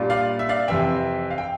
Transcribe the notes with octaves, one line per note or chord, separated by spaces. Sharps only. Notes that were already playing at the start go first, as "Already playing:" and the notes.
Already playing: A#2 G3 D4 F4
D5 F5
E5
D5 F5
F2 C3 E3 E5 G5
F5
G5